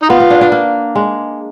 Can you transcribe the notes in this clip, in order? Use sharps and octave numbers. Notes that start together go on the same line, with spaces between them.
D#4
B3 F4
B3
D4
D4
A#3
G#3